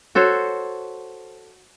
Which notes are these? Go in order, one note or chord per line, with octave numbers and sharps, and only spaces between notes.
F#4 A4 C5 C#5